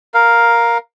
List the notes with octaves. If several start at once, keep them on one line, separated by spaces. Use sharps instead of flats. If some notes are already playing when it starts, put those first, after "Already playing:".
A#4 F5